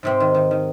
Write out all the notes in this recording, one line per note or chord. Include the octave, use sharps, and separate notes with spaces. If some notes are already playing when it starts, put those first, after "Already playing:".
G#2 C3 C4
D#3
D#3
D#3